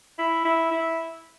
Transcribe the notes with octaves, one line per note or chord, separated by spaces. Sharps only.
E4
E4
E4